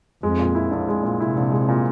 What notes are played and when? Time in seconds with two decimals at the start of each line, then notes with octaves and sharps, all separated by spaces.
0.23 F2 G#3
0.40 A#2
0.55 E4
0.71 A#1
0.88 G#3
1.03 A#2
1.19 C3 E4
1.37 A#1
1.52 G#3
1.68 A#2